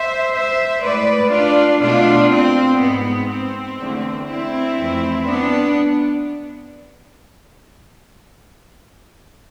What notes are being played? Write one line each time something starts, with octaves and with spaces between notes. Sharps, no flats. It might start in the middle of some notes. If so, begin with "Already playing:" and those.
Already playing: C5 E5
C5 E5
A2 G#3 B4 D5
D4 F4
B2 A3 D4 F4
C4
G#2 G#3 B3
C4
E2 D3 A3
C4 E4
F2 E3 A3
B3 D4